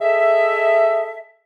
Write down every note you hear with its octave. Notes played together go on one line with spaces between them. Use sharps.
G#4 A4 D#5 E5